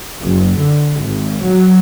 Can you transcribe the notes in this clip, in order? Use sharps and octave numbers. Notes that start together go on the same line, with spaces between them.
F#1
D3
G#1
F#3